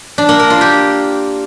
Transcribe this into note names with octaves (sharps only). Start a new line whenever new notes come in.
D4
A#3
A#4
F4
G4